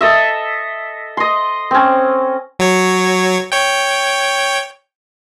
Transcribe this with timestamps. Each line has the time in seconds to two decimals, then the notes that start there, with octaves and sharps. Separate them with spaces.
0.01 A4 D#5 E5
1.17 D#5 C6
1.71 C4 C#4
2.59 F#3 C#5
3.52 C#5 G5